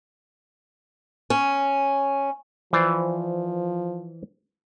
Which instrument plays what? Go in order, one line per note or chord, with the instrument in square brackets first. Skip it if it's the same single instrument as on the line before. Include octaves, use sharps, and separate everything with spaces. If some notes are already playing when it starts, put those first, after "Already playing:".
[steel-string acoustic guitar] C#4
[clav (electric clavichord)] E3 C5 D5 [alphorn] F3